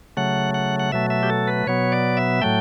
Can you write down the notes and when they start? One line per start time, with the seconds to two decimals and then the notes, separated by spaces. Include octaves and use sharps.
0.17 C#3 F#3 A3 F#5
0.54 F#5
0.79 F#5
0.92 B2 F#3 A3 E5
1.10 E5
1.23 G4
1.30 A4
1.48 B4
1.67 B2 F#3 B3 C#5
1.92 D5
2.17 E5
2.42 A2 F#3 A3 G5